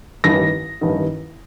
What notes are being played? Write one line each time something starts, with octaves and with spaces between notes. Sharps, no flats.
A1 G2 D#3 A#6
A1 G2 D#3